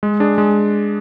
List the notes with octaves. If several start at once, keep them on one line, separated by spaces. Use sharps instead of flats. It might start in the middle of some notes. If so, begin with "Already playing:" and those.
G#3
D4 G#4
G#3